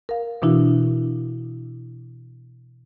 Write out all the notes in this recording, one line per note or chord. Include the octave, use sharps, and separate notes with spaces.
A#4 F5
B2 E3 D4 E4 F#4